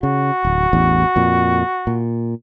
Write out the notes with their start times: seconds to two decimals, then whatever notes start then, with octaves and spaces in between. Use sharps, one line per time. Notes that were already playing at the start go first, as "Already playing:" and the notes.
0.03 C#3 F#4
0.45 D1
0.73 A1 E2
1.16 F2 A#2
1.87 A#2